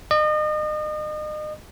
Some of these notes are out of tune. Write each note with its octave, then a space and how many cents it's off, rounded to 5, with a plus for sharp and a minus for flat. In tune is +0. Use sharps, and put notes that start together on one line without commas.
D#5 -35